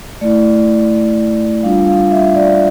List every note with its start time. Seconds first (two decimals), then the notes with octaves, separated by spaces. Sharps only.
0.21 A3 E4 D5
1.63 G3 D4 F4 F5
1.88 F5
2.11 E5
2.35 D5